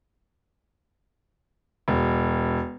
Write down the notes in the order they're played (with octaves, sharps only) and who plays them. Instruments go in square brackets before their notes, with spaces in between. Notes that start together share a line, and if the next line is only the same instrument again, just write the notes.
[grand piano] E1